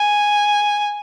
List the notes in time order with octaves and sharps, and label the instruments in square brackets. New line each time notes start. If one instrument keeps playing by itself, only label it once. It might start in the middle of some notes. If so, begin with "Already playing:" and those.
Already playing: [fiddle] G#5